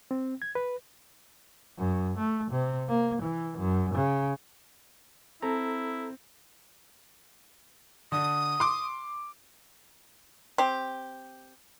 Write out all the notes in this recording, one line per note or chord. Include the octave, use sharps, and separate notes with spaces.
C4
G#6
B4
F#2
A3
C3
A#3
E3
F#2
C#3
C4 E4 A4 A#5
D3 D#6
C6 D6
C4 G4